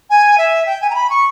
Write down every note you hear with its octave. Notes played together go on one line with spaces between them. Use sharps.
G#5
E5
G5
G#5
A#5
B5
C#6